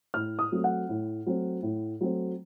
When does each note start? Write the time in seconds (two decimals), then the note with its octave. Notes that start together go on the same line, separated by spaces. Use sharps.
0.14 A2 F6
0.39 D#6
0.52 F#3 A3 C4
0.64 F#5
0.89 A2
1.26 F#3 A3 C4
1.62 A2
2.01 F#3 A3 C4